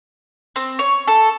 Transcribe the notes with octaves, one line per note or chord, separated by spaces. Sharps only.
C4
C#5
A4